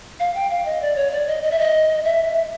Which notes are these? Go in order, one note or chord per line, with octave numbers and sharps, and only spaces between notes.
F5
G5
F5
D#5
D5
C#5
D5
D#5
D#5
E5
D#5
E5